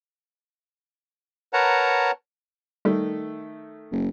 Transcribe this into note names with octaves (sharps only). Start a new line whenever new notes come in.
A#4 B4 C#5 F#5 A5 A#5
D#3 G3 A3
F#1